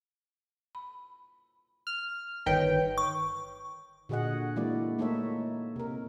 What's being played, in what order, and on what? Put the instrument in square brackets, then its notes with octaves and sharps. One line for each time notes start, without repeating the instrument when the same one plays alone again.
[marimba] B5
[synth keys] F6
[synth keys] G1 D#3 G5 [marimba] A#4 B4 C#5
[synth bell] C#6
[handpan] A#2 D3 F#4 G#4 D#5 F#5
E3 G#3 A#3 E4 F#4 D5
A3 A#3 D#4 A4 C#5 E5
C3 A#4